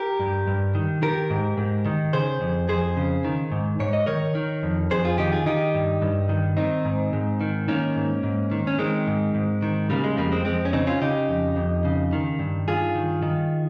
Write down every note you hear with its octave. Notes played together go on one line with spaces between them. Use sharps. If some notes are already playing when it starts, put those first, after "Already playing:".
Already playing: G4 A#4
G2
G2
D#3
D#3 G4 A#4
G#2
G#2
D#3
C#3 G#4 C5
F2
F2 G#4 C5
C#3
D#3
G#2
G#2 C#5
D#5
D#3 A#4 C#5
D#3
F2
F2 G#4 C5
F4 G#4
D#3 D#4 G4
F4 G#4
D#3 D#4 G4
G2
G2
D#3
D#3 C4 D#4
G#2
G#2
D#3
D#3 A#3 C#4
G#2
G#2
D#3
C#4
D#3 G#3 C4
G#2
G#2
D#3
C#3 G3 A#3
G#3
F2 G3 A#3
G#3 C4
F2 G#3 C4
C#4
C#3 C4 D#4
C#4 F4
C#3 D#4 G4
F2
F2
C#3
D#3
G2
G2 F4 G#4
D#3
D#3